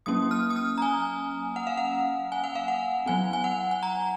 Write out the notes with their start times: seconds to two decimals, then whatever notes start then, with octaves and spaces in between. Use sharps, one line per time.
0.06 F#3 A#3 C#4 D#6
0.31 F6
0.50 D#6
0.56 F6
0.78 A#5
0.82 G#5
1.56 F#5
1.67 F5
1.77 F#5
2.32 G#5
2.44 F#5
2.55 F5
2.68 F#5
3.06 F#3 B3 G#5
3.33 G#5
3.44 F#5
3.71 G#5
3.83 A#5